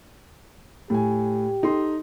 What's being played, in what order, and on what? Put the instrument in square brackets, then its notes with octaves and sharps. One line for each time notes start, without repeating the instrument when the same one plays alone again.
[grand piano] A2 G#5 [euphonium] G4
[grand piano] D#4 A4 C6